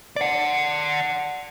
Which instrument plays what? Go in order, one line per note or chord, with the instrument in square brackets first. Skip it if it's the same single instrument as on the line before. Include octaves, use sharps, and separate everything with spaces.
[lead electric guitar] D5 F#5